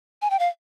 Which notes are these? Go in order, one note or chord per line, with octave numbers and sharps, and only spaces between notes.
G#5
G5
F5